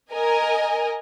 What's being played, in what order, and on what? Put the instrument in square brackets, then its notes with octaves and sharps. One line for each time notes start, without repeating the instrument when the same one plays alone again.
[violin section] A#4 D#5 G#5